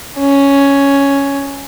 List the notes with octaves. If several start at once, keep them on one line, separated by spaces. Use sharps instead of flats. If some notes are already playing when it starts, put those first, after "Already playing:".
C#4